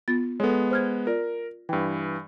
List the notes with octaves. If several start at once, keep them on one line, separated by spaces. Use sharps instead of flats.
B3 F4 A6
G#3 B3 A4 C#5
C5 F6 G#6
F4 A#4 D5
G2 E3 G5